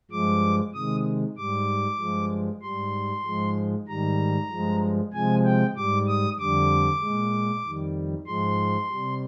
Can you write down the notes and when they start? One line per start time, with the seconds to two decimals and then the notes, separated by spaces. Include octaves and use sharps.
0.11 G2 F3 G#3 D6
0.74 C3 D#3 G#3 D#6
1.37 G#2 G3 D6
1.99 G2 F3 G#3
2.62 G#2 G3 C6
3.25 G#2 F3 G#3
3.88 G#2 D#3 G3 A#5
4.51 G2 F3 G#3
5.13 C3 F3 G#3 G#5
5.45 G5
5.76 G#2 G3 D6
6.07 D#6
6.39 F2 D3 G3 D6
7.01 A#2 G#3
7.64 F2 D#3 G3
8.27 G#2 F3 G#3 C6
8.89 C3 G3